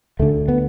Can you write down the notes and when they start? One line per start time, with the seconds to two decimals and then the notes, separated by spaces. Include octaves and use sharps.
0.19 D2 D3 A3
0.48 B3